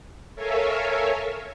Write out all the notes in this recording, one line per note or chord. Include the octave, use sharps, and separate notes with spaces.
A4 A#4 C#5 E5 F5 G#5